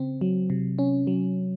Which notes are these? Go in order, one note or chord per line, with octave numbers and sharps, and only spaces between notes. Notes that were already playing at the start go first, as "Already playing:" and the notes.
Already playing: C#3 C4
F#3
C3
C#4
F#3